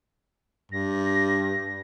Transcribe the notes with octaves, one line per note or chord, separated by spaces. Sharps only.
G2 A#6